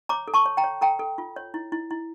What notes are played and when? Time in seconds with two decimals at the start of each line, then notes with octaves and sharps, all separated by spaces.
0.09 C#5 A#5 D6
0.28 A4
0.34 A5 C#6
0.46 C#5
0.57 G5 A#5
0.64 C#5
0.81 A4 G5 A#5
0.99 A4
1.18 F4
1.36 C#5
1.54 E4
1.72 E4
1.91 E4